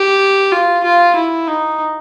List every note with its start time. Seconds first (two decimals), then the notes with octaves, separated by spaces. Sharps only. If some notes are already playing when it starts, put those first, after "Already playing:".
Already playing: G4
0.52 F4
0.84 F4
1.15 E4
1.47 D#4